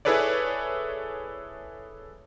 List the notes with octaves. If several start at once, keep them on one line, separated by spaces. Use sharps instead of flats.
E4 G#4 A4 B4 C#5 D5